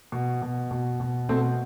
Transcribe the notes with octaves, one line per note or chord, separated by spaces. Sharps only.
B2
B2
B2
B2
B2 A3 C4